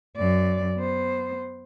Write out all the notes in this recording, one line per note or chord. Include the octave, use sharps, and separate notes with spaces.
F#2 D5
B3 C5